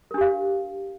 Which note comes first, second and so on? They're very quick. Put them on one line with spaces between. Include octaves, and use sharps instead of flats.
A#4 D4 G4 F5